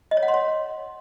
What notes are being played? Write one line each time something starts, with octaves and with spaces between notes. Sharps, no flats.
D#5
C#5
F#5
C6
C#5